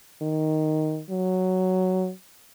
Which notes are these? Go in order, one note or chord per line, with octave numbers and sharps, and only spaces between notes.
D#3
F#3